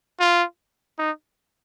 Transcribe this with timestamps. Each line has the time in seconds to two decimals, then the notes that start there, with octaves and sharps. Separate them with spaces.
0.20 F4
0.99 D#4